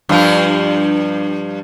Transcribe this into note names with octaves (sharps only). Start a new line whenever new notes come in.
G2 F3 F4